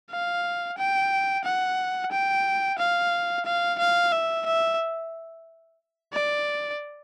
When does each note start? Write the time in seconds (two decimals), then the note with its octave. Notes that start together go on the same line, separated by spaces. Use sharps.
0.11 F5
0.78 G5
1.45 F#5
2.12 G5
2.79 F5
3.46 F5
3.79 F5
4.12 E5
4.46 E5
6.13 D5